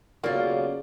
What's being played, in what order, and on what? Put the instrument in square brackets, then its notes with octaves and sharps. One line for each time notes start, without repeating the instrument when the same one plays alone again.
[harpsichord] B1 [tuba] C#3 [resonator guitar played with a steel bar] A#3 F4 [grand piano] D5